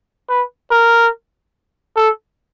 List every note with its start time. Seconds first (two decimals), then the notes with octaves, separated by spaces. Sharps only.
0.29 B4
0.71 A#4
1.97 A4